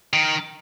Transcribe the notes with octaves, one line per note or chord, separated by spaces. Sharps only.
D#3